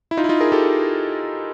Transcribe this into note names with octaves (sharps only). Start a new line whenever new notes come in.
E4
D#4 F4
E4
D#4 F4
G#4 A#4
G4 A4